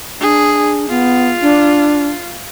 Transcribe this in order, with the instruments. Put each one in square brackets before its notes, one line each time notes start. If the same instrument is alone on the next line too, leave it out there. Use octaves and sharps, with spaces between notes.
[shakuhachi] D4 [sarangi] G#4
[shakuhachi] B3 [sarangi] F4
[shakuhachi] D4